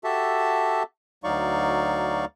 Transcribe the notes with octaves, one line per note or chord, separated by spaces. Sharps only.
F#4 G4 A4 E5 A5
D2 F#3 D#4 D5 F5 C#6